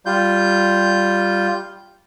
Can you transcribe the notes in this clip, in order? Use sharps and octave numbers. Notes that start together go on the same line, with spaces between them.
G3 F4 G6